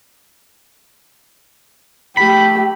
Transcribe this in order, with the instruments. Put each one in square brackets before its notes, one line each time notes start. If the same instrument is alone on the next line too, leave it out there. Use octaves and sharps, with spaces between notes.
[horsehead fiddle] A3 G4 [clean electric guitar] B5